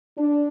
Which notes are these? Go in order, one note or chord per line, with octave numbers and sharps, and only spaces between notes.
D4